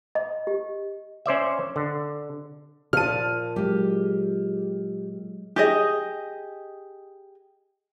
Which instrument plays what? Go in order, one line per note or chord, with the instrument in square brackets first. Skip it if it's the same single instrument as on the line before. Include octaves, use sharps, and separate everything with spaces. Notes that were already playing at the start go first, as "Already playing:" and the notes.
[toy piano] D#5
G4
[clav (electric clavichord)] C#4 C5 D5 E5
D3
[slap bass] A#2 [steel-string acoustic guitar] F3 A5 [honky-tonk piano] F6 D#7
[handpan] F#3 G#3 [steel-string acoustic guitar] G4
[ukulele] G4 G#4 D#5